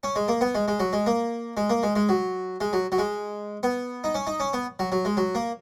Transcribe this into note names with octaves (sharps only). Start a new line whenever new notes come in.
C#4
G#3
A#3
B3
G#3
G#3
F#3
G#3
A#3
G#3
A#3
G#3
G#3
F#3
G#3
F#3
F#3
G#3
B3
D#4
C#4
D#4
C#4
B3
F#3
F#3
G#3
F#3
A#3